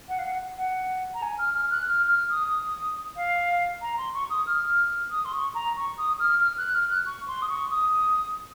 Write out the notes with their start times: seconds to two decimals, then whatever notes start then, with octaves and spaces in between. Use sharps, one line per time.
0.09 F#5
0.19 F5
0.25 F#5
0.57 F#5
1.14 A#5
1.22 G#5
1.38 F6
1.55 F6
1.71 F#6
1.87 F6
2.09 F6
2.30 D#6
3.17 F5
3.82 A#5
3.98 C6
4.14 C#6
4.30 D#6
4.47 F6
5.11 D#6
5.25 C6
5.33 C#6
5.55 A#5
5.76 C#6
5.98 D#6
6.20 F6
6.41 F6
6.58 F#6
6.74 F6
6.90 F#6
7.06 C#6
7.28 C6
7.42 D#6
7.49 C#6
7.71 D#6